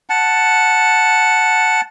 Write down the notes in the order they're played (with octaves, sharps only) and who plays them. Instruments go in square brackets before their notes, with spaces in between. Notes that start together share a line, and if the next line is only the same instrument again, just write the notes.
[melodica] F#5 A5